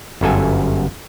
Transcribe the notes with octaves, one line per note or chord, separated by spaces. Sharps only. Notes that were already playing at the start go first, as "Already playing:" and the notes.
G1 F#2 A4 G#5